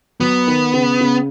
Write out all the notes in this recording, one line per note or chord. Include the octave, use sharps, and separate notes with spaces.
F#3 B3
D#3
C#3
C#3